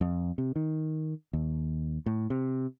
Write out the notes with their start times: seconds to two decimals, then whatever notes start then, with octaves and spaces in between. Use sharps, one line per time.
0.01 F2
0.38 C3
0.56 D#3
1.33 D#2
2.06 A2
2.30 C3